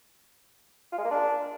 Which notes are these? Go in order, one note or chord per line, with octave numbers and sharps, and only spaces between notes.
F4
G#3
A#3
D4